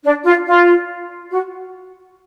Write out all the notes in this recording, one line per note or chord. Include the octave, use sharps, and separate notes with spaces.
D4
F4
F4
F#4